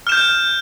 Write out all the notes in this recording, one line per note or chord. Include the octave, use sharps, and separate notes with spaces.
F6 G6 E7